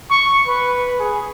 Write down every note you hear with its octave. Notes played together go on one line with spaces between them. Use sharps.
C#6
B4
G#4